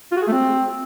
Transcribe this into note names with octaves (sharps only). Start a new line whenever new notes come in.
F4
F#4
G#4
A3
C4